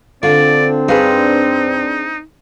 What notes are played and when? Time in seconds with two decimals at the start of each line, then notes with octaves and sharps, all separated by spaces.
0.23 D3 C4 D4 F4 D5
0.89 G2 D#4 G#4 B4 F5